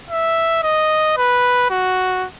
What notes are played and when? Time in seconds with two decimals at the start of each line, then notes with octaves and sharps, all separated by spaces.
0.10 E5
0.63 D#5
1.17 B4
1.70 F#4